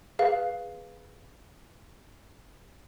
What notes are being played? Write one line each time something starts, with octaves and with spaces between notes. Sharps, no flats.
G#4 B4 F5